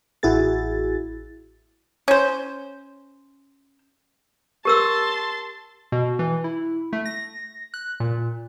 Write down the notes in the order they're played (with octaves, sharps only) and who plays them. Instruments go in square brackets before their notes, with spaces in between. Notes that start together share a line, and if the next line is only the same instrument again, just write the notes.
[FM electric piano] A1 E4 F#4 G#4 A6
[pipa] C#4 C5
[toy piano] G4 A#4 E6 [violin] A5 C6
[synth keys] B2
E3
E4
A3
A#6
F#6
A#2